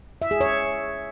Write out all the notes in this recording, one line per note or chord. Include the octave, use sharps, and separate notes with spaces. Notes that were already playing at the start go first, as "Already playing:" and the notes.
E5
G#4
C#5